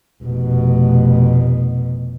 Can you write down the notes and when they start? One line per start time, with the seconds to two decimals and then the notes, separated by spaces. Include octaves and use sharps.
0.24 F1 B2